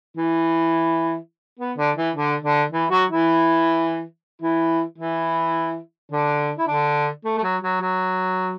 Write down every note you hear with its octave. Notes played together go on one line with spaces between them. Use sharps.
E3 E4
B3
D3 D4
E3 E4
D3 D4
D3 D4
E3 E4
F#3 F#4
E3 E4
E3 E4
E3 E4
D3 D4
E4
D3 D4
A3
A3
F#3
F#3
F#3